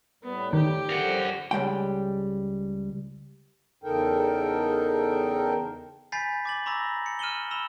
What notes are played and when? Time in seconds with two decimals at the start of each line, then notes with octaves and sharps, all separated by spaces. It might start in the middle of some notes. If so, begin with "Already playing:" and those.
0.23 A2 G3 B3
0.53 D#3 G4
0.89 D3 F3 G3 A#4 F#5
1.51 C#2 G3 G#3 G5
3.84 E2 C#3 D#4 A4 A#4 G5
6.12 G#5 B5 G6 A6 B6 C7
6.45 D6 A6 F#7
6.66 A#5 B5 C#6 D6 E6 A#6
7.06 C#7
7.19 F6 D#7 E7 F#7 G7
7.51 B5 E6 E7 G7